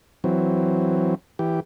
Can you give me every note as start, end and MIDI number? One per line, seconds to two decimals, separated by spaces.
0.24 1.15 52
0.24 1.15 54
0.24 1.15 60
1.39 1.60 52
1.39 1.60 67